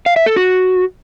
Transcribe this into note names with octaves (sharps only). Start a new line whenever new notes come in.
F5
E5
A4
F#4